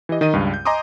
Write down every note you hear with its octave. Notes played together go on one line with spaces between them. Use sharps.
E3 G4 D#5
D#3 D#5 D#7
C#2 G2
G6
D#5 G#5 A#5 C6 D6 D#6